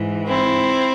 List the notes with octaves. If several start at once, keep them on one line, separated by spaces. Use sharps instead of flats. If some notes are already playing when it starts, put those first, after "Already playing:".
Already playing: G#2 E3
C4 E4